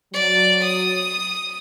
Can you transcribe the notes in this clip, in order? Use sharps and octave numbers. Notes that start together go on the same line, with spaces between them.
F#3 D5
D#6